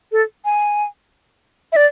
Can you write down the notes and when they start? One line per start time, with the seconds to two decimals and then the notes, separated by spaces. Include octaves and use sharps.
0.12 A4
0.45 G#5
1.72 E5
1.76 D5